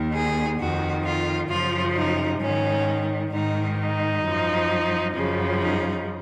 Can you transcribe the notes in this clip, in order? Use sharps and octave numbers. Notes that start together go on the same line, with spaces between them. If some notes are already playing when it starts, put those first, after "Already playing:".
Already playing: D#2 D#3
G#4
F2 D#3 F#4
F4
F#2 C#3 F3 F4
D#4
G#2 D#3 C#4
G#2 D#3 D#4
D#4
F#2 F3
F#2 C#3 F3
D#4